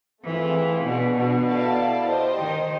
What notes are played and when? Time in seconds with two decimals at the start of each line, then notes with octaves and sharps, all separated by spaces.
0.23 E3 A3 C4 F4 G#4 C5
0.84 B2 B3 D4 F#4
1.16 B2
1.46 E4 A4 D5 F5 A5
2.08 G4 C5 D#5
2.38 D#3